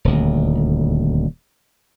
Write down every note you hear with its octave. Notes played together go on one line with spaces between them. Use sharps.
D#1 D2